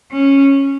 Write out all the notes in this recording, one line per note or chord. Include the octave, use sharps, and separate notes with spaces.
C#4